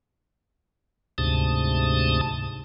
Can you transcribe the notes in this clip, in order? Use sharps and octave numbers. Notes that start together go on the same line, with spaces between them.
D2 G#2 C3 A5 D#6